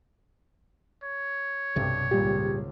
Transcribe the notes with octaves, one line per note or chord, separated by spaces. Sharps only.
C#5
B1 G2 C3
G#1 C#2 A#2 G3 G4